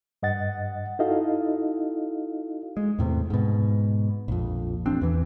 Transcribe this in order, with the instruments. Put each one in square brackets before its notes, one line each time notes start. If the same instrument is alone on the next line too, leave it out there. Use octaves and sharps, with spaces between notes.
[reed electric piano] G2 D#5 F#5 A6
D#4 E4 F#4 A4 D#5 F5
[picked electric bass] G#3
E2 A2 C3
G#2 B2
A#1 F2
A1 C4 D4
E2 E3